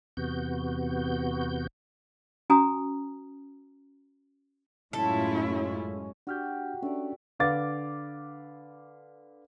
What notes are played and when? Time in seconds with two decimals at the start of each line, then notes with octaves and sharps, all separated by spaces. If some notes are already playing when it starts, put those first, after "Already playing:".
0.17 E2 C3 B3 F#4 G6
2.50 C#4 F#4 G#5 A#5 D#6
4.93 F#2 A2 G#3 C#4 E4 F4 A4
6.27 D4 F#4 G4 F6 G6
6.82 A3 C#4 D4 D5
7.40 D3 B4 F5 D6 A6